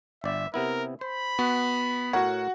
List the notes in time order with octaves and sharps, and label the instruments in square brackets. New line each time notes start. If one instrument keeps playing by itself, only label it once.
[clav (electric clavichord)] G1 D5 [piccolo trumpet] E5
[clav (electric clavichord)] C3 B3 E4 [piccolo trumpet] A#4
[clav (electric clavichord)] C5 [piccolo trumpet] B5
[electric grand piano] B3 [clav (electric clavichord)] F#4
[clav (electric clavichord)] A2 A#4 C#5 [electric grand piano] F#4 F#5